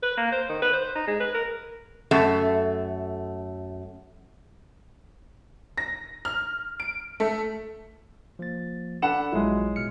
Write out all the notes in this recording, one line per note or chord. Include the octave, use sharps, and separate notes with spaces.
B4
A#3
C5
D#3
B4
C5
D#4
G#3
B4
A#4
F#2 A3
A#6
F6
D7
A3
F3 A#3 A6
D4 A4 F#5 B5 E7
A#1 F#3 G#3 E4 F4
B2 F6 C#7